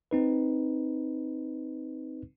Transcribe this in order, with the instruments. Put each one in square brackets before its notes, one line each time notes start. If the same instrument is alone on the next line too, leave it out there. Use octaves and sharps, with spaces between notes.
[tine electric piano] C4 D#4 B4